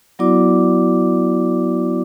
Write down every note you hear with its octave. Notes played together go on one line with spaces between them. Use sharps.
F#3 B3 E4 F#4 D5 D6